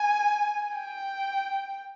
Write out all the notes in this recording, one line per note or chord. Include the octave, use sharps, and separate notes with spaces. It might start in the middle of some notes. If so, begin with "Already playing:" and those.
Already playing: G#5
G5